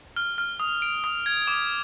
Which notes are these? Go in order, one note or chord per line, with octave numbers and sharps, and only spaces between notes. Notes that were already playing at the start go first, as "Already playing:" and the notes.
F6
F6
D#6
D7
D#6
G#6
D6